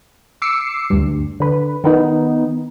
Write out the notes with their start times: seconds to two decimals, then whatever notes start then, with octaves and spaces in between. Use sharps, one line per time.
0.42 D6 E6 C7 C#7
0.90 D2 G2
1.40 D3 B4
1.84 D#3 B3 D#4